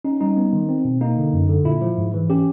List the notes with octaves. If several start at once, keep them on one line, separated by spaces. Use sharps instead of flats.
C#4 D#4
G3 D#4
B3
D#3
C4
B2
A#3 D#4
D3
F#2
D3
A#2 E4
F3
G#2
E3
C#4 G4